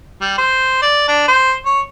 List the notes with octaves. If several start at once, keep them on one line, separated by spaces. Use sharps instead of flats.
G3
C5
D5
D4
C5
C#5